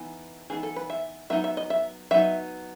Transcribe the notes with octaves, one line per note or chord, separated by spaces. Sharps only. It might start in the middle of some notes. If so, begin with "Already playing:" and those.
Already playing: E3 B3 D#4
E3 B3 D#4 G#4
A4
B4
E5
F#3 B3 D#4 E5
E5
D#5
E5
F#3 B3 D#4 E5